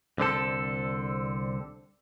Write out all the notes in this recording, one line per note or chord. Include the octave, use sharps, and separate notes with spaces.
C2 D3 C4 A4